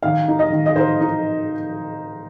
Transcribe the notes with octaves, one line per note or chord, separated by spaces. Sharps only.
D#3 F5
D#4
D#5
D#3
D#5
D#4 C5
D#4